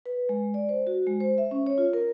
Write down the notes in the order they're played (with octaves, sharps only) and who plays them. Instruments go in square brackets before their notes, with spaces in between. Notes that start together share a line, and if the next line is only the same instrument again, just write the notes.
[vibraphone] B4
G#3
D5
C5
F#4
G#3
C5
E5
C#4
C#5
F4
A#4